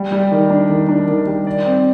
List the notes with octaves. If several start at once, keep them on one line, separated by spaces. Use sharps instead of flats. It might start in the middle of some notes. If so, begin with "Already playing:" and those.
Already playing: G3
G3
D#3
D4
D#3
D4
D#3
G3
D5
C4